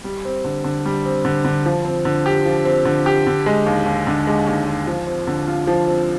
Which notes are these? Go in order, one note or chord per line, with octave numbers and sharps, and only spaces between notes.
G3
C4
D3
D3
G3
C4
D3
D3
F3
C4
D3
G4
F3
C4
D3
G4
D3
G#3
D#2
D#2
D3
G#3
D#2
D#2
F3
C4
D3
F4
F3
C4